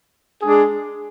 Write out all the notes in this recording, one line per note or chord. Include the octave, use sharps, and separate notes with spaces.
G#3 D4 G#4